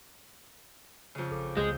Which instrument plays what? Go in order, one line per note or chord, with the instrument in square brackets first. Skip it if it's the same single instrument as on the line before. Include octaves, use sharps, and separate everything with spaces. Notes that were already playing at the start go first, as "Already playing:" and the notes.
[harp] F2 C#3
[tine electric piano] A1 A4 D6
[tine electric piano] C#2 C#3 [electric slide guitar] G#3 [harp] G6